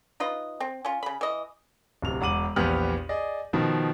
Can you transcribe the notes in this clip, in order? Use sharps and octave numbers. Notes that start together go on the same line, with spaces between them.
D#4 F4 B4 D#5
C4
C#4 F4
C#3 B5
E3 D#5
D1 C3 F7
E1 F#5 D6 D#7 F#7
A#1 E2 B3 G4 F6 F#7
G#4 D5 D#5
B2 D#3 F3